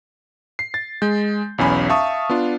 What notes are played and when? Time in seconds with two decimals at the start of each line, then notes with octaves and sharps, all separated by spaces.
0.59 C7
0.74 A6
1.02 G#3 G6
1.58 B1 E2 C#4 G#5 B5
1.90 E5 F5 A5 C#6 D#6
2.29 B3 D4 F4